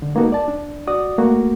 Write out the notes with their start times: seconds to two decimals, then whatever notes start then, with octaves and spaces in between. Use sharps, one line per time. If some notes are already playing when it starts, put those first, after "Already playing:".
0.02 D3
0.15 G#3 A#3 B3 D#4 F#4 A4
0.32 D5 A5
0.48 D4
0.87 F#4 D5 D#6
1.18 A3 A#3 F#4